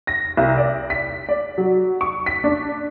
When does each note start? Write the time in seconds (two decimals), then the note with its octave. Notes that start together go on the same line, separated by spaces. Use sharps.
0.07 A#6
0.37 C2
0.57 D5
0.90 B6
1.29 D5
1.58 F#3
2.01 C#6
2.26 B6
2.44 D4